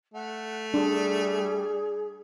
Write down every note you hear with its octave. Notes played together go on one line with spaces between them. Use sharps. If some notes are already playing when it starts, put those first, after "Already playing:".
A3 F#5
G3 D4 G#4